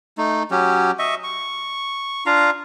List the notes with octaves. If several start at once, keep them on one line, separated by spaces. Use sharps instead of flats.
A3 D#4
F#3 C#4 G4
D#5 E5 C#6
C#6
D4 F4 F5 A#5